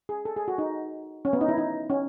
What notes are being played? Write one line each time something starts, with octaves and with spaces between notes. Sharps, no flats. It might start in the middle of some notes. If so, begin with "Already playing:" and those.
G#4
A4
G#4
F#4
D#4
C#4
B3
D#4
E4
D#4
C#4